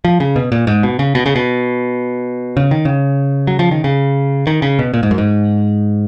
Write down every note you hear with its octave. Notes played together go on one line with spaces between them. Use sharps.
F3
C#3
B2
A#2
G#2
B2
C#3
B2
C#3
B2
C#3
D#3
C#3
F#3
F3
D#3
C#3
D#3
C#3
B2
A#2
G#2
F#2
G#2